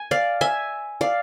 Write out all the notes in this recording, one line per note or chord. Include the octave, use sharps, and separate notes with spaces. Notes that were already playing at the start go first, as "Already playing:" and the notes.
Already playing: G#5
D5 F5
E5 G#5
D5 F5